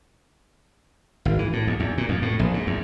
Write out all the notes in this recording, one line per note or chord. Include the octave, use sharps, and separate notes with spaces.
G#1
E3
A2
D#2
E2
A#2
F2
A2
A#1
G#2
E2